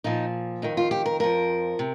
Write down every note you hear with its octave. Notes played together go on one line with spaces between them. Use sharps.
A#2 F3 D#4
F2 D#3 D#4
F4
G4
A#4
F2 F3 A#4
C3